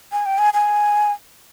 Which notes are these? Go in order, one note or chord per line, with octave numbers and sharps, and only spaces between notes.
G#5
G5
G#5
G#5